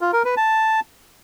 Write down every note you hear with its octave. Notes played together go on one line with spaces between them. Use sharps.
F4
A#4
B4
A5